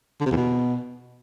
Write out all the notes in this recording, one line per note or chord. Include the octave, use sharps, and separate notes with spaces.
D3
C3
E2
B2